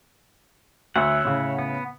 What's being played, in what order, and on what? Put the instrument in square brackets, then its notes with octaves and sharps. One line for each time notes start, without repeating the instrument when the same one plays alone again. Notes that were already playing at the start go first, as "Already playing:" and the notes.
[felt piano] D2 [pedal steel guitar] C#5 E5 F#5
[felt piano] A2 C#3
[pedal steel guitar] B3